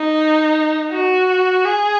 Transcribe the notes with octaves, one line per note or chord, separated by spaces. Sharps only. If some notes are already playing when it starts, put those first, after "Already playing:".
Already playing: D#4
F#4
G#4